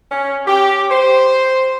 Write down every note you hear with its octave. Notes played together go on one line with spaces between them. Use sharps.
C#4
G4
C5